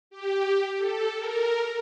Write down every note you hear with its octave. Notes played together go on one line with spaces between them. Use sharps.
G4
A4
A#4